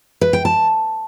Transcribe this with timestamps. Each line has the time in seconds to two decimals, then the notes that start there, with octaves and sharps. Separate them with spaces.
0.21 B4
0.33 G5
0.45 A5